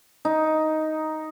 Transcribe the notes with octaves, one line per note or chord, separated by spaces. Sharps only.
D#4